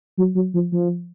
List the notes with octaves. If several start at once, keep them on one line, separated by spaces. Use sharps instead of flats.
F#3
F#3
F3
F3